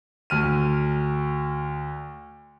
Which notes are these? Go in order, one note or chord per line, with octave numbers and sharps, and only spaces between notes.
D2 F6 D#7